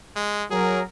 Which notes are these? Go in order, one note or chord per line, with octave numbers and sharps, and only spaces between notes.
G#3
F#3 G#4 A#4